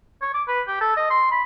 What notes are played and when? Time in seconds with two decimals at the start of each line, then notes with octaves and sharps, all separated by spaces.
0.22 C#5
0.34 D6
0.48 B4
0.68 G4
0.81 A4
0.97 D#5
1.10 C6
1.31 B5